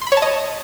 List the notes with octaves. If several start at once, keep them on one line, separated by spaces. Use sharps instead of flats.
C6
B5
C#5
A5
D#5